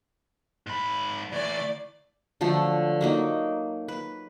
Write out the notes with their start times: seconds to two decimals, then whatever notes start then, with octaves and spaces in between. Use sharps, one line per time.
0.67 G#2 B5
1.33 E3 A3 D5
2.41 D3 F3 F#3 A3
3.01 F#3 A#3 D#4
3.88 B4